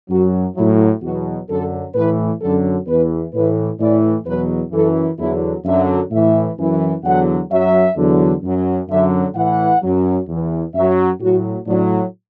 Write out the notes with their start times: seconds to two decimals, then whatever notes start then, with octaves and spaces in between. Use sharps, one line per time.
0.09 F#2 F#3 F#4
0.55 A2 F#3 E4
1.02 E2 B2 F#3 F#4
1.49 F#2 D3 F#3 A4
1.94 A2 E3 B4
2.41 F#2 D3 F#3 A4
2.87 E2 E3 B4
3.34 A2 E3 B4
3.80 A2 E3 D5
4.26 E2 B2 F#3 B4
4.72 F#2 E3 A4
5.18 E2 D3 F#3 E4
5.65 F#2 D3 F#3 E5
6.11 A2 E3 E5
6.57 F#2 E3
7.04 E2 D3 F#3 F#5
7.50 F#2 F#3 E5
7.97 E2 D3 F#3
8.43 F#2 F#3
8.88 F#2 D3 F#3 E5
9.35 A2 E3 F#5
9.81 F#2 F#3
10.27 E2 E3
10.74 F#2 F#3 E5
11.20 A2 F#3 F#4
11.66 A2 F#3 D4